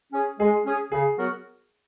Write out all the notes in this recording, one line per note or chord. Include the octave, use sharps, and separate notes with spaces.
C#4 G#4
G#3 G#4
C#4 G#4
C#3 G#4
F#3 B3 F#4 A#4